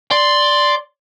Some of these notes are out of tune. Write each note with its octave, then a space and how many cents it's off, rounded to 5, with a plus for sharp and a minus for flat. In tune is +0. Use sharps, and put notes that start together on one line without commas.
D5 +0 C6 +0